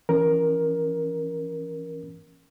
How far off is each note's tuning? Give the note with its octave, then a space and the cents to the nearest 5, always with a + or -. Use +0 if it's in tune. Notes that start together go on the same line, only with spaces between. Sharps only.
E3 +20 C#4 +0 A#4 +10